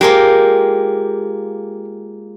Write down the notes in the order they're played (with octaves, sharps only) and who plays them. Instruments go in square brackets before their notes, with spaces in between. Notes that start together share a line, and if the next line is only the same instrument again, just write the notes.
[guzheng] G#3 A#3 F4 [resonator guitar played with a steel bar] G4